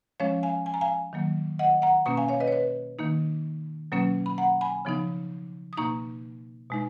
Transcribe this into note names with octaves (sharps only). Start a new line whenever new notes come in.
F3 G#3 C#4 C#5 F5
F5 G#5
G#5
A#5
F5 G#5
D#3 F#3 A#3
D#5 F#5
F#5 A#5
B2 A#3 C#4 A#5 C#6
F5 G#5
C#5 F5
B4 D#5
C#5
B4
D#3 A#3 D#4
B2 F#3 A#3 C#4
B5
F#5 A#5
G#5 B5
C#3 F3 B3 D#4
D#6
B2 A#3 D#4 A#5 C#6
B2 G#3 D#4